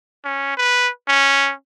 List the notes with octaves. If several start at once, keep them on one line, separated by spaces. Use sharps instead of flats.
C#4
B4
C#4